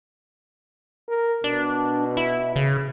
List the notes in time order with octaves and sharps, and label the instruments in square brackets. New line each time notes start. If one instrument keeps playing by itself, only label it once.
[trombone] A#4
[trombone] B2 [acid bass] D4
[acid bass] E4
C#3